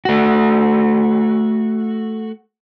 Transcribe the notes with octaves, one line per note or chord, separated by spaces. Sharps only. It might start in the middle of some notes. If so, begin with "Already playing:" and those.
A3 F#4